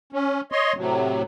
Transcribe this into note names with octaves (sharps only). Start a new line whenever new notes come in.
C#4
C#5 D#5 C6
A2 C3 F#3